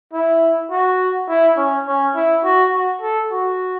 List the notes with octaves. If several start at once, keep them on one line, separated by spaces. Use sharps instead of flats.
E4
F#4
E4
C#4
C#4
E4
F#4
F#4
A4
F#4